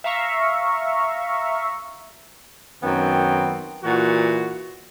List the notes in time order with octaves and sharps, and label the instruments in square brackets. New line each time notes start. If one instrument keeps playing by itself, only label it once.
[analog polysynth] E5 F5 A#5 C#6
[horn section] F#2 D#3 B3 C4 G5
A#2 E3 F#4